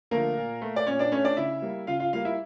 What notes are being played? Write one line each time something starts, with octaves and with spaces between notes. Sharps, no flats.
D3 F3 A3 A#3 A#4
A#2
A3
D5
A#2 C#4 C#5
D4 D5
A3 C#4 C#5
D4 D5
C#3 E4 E5
G3 A#3
C#3 F4 F5
F4 F5
G3 A#3 F4 F5
E4 E5